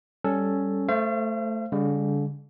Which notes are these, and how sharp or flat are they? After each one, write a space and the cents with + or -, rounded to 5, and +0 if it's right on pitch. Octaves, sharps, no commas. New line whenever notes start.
G3 +0 C#4 +0 A4 +0
A3 +0 C5 +0 F5 -45
D3 -45 G3 +35